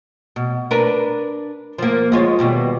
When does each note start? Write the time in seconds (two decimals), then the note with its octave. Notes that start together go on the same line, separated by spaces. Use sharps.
0.36 B2
0.71 D4 A#4 B4
1.78 F3 A#3
2.12 G#3 F4 C#5
2.39 D#2 B2 G3